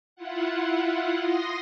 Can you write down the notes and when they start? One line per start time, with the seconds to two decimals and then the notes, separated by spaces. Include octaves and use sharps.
0.16 E4 F4 F#5
1.20 C6 D#6 A#6